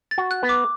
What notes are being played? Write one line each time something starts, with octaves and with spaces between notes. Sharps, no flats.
A6
F#4
F#6
B3
D6